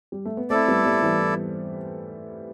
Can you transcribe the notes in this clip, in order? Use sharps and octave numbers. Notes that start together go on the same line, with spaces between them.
G3
A3
B3
A3 C4 E4 A4 D5
G3 B3
G3 B3
E3 G3